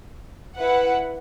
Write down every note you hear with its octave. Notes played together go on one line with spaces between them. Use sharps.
E4 B4 F#5